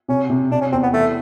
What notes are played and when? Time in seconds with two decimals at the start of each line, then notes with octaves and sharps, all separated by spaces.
0.08 C3 C#4
0.30 C3
0.51 C3 D4
0.61 C#4
0.72 E2 C4
0.83 B3
0.93 E3 A3